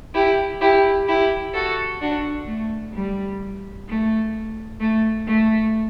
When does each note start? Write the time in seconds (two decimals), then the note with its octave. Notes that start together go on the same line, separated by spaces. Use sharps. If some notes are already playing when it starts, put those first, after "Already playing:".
0.13 E4 G4
0.60 E4 G4
1.07 E4 G4
1.53 F#4 A4
2.00 D4 F#4
2.47 A3
2.93 G3
3.87 A3
4.80 A3
5.27 A3